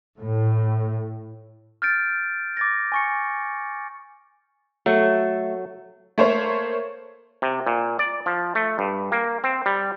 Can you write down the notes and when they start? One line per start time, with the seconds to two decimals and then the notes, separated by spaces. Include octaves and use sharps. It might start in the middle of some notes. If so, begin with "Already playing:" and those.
0.21 A2
1.82 F6 G6 A6 D7
2.57 D6 A6 A#6
2.92 G#5 C#6 C#7
4.86 F#3 A3
6.18 A3 A#3 C5 C#5
7.42 C3
7.67 A#2
7.99 D5
8.26 F3
8.55 A3
8.79 G2
9.12 A#3
9.44 C4
9.66 G3